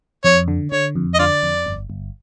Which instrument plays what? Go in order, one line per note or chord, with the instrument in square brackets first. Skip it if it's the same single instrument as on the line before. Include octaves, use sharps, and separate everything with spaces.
[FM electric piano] F2 [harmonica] C#5
[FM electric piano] D3
[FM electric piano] D3 [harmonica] C#5
[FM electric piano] F2
[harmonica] D#5
[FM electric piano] D3 [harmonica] F4 D5
[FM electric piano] F2
G1
G1